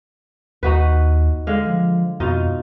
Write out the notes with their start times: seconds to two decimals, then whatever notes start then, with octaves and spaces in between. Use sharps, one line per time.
0.63 D#2 D#4 F#4 B4
1.47 D3 G#3 F5
1.67 F3
2.20 F2 B2 D#4 F4